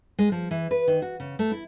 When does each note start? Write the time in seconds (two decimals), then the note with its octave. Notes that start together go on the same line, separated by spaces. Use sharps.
0.19 G#3
0.32 F3
0.51 E3
0.71 B4
0.88 D#3
1.02 F#4
1.20 C#3
1.39 A3
1.52 E4